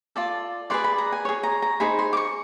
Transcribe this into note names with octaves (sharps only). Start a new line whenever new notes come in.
F4 A4 D5 A5
G#4 B4 D5 C6
B5
A#5
G#5
G#4 C#5
A#5
A#5
D#4 G#4 C5 B5
C6
D6
C#6